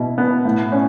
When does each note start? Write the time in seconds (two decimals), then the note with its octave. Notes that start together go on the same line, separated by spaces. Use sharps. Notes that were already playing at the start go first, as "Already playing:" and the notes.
Already playing: B2 E4
0.18 B3
0.45 A2
0.72 C#4